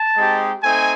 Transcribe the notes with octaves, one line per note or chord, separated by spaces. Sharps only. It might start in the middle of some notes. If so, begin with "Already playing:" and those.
Already playing: A5
G#3 C4 D#4 G4
A3 C4 D#4 G#5